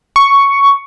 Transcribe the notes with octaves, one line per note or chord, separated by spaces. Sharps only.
C#6